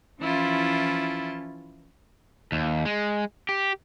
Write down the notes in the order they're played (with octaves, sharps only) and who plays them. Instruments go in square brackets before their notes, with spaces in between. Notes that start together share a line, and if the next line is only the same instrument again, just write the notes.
[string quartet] E3 F3 C#4 E4 F4 A5
[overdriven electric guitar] D#2
G#3
G4